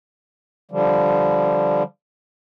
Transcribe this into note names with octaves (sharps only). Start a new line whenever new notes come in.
D3 F3 G3